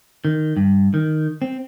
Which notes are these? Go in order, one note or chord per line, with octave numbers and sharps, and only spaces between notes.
D#3
G2
D#3
C4